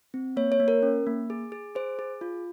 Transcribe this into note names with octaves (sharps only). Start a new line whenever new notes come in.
C4
A#3 C#5
C#5
A#3
A#4
C#4
A#3
G#4
G#4
G#4 C5
G#4
F4